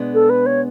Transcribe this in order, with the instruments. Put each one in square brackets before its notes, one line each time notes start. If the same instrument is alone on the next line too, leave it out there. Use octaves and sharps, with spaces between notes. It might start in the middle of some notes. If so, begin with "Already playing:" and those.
Already playing: [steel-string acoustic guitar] B2 G#3 B3 D4
[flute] A4
B4
C#5